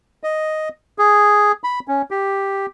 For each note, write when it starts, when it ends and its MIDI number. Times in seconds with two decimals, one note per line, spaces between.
0.24 0.69 75
0.98 1.52 68
1.64 1.80 83
1.88 2.02 61
2.11 2.66 67